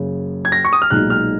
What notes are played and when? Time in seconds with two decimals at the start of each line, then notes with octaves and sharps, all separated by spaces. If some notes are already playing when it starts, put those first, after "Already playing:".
Already playing: F#1 F#2 C#3
0.45 G#6
0.52 A#6
0.65 C#6
0.73 D#6
0.82 F6
0.90 B1 A#2 G#3 D#4 F#6
1.10 F6